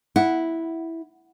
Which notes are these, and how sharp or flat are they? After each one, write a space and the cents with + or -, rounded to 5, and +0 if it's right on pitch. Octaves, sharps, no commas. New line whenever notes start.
E4 -5 F#5 +0